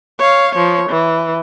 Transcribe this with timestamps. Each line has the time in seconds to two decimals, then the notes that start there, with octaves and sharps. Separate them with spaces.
0.19 C#5 F5
0.54 F3 C#5
0.90 E3